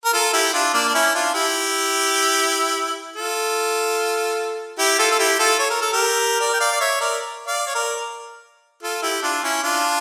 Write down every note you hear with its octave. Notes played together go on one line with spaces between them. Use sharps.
A#4
F4 A4
E4 G4
D4 F4
A#3 D4
D4
C#4 E4
D4 F4
E4 G4
F4 A4
E4 G4
F4 A4
A4
E4 G4
F4 A4
C#5
A#4
A4
G4 A#4
A#4 D5
G5
D5 F5
D5
C#5 E5
A#4 D5
D5 F5
C#5
A#4 D5
F4 A4
E4 G4
D4 F4
C#4 E4
D4 F4